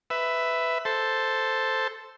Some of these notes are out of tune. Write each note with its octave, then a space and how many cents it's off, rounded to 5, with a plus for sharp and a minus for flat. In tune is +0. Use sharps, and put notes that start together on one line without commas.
B4 +10 E5 +0
A4 +0 C5 +0